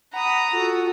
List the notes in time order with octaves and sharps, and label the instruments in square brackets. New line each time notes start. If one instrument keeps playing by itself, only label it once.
[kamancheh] F#5 B5 [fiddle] A#5 D#6
[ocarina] F4 [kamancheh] F#4 A4